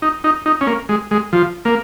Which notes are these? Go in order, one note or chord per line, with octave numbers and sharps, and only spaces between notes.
D#4
D#4
D#4
C#4
A#3
G#3
G#3
F3
A#3